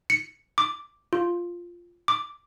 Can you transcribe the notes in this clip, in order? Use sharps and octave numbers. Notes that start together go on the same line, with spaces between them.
C#7
D6
F4
D6